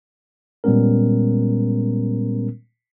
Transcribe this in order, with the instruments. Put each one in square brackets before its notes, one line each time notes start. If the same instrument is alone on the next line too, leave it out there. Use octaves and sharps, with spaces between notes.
[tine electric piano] A#2 G3 G#3 B3 C#4 A#4